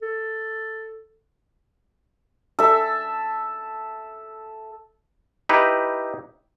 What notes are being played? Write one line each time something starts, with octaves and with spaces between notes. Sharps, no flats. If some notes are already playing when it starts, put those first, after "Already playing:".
A4
A4 E5
D#4 E4 G4 B4